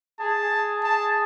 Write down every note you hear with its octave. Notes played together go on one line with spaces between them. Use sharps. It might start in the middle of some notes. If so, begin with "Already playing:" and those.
G#4 A5
G#4
A5